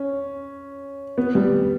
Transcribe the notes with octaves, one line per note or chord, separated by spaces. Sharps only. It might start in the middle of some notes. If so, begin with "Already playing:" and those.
Already playing: C#4
B3
G3